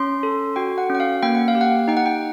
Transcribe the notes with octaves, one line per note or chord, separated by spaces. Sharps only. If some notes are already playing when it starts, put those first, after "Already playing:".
Already playing: C#4 C6
A4
F#4 G5
F#5
C#4 F#5
F5
A#3 G5
F#5
F5
G4
F#5
D#4 G5
F#5
G5